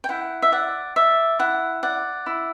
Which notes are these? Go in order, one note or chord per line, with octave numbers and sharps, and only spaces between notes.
G5
E4 F#5
E5
D5 F#5
D5 E5
E4 F#5
D5 F#5
E4